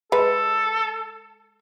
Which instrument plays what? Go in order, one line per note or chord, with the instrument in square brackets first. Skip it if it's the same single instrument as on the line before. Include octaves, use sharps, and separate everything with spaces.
[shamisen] G#3 B4 [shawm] A4